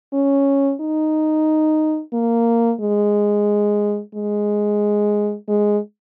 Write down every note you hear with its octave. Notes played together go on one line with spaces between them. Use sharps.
C#4
D#4
A#3
G#3
G#3
G#3